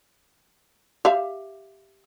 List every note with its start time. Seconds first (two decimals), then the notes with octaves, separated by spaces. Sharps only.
1.05 G4 E5 F5